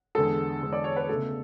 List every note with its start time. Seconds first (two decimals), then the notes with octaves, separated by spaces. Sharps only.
0.15 E2 D3 G#3 A4
0.62 E2 D3 G#3
0.73 D5
0.84 C#5
0.96 B4
1.08 C#2 B2 A3 A4